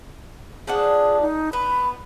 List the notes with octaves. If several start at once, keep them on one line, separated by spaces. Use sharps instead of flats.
F3 D4 G#4 F#5
D#4
B3 B5